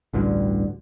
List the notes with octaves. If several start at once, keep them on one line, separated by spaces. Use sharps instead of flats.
A1 D2 G2 D3